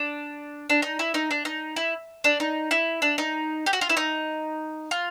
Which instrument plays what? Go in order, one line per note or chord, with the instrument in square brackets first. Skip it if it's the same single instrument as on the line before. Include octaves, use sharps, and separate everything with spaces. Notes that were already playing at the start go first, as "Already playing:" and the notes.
Already playing: [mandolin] D4
D4
D#4
E4
D#4
D4
D#4
E4
D4
D#4
E4
D4
D#4
G4
F#4
F4
E4
D#4
F4